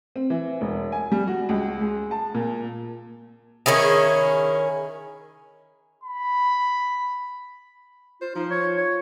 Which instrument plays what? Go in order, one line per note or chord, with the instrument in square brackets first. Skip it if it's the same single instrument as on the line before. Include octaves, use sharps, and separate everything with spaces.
[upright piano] C4
E3
E1
G#5
G3
F#4
C#2
G#3
A5
A#2
[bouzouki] D#3 C#4 E4 G#4
[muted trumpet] B5
[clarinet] F4 [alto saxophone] C5
[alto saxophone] F3 [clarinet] D#4
[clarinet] C#5
C#5